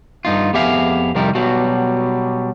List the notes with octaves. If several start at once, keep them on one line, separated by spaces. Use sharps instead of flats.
G2 D#4 F4
F2 B3 G4 G#4 E5 F5
C2 F2 C3 D#3 G3 A#4
B2 F#3 G3